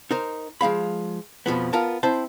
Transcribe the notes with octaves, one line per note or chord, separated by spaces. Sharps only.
D#4 A#4 C5
F3 G#3 F5 B5
F2 B2 F3 B3
B3 F4 A#4 A5
C4 E4 C5 A5